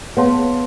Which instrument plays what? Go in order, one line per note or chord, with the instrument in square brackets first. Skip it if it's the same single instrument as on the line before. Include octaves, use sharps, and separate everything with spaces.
[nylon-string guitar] B3 [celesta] G#4 C#5 F5 A5 C6